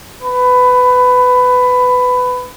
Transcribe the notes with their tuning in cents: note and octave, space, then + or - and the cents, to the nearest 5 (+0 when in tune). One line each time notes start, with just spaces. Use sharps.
B4 +15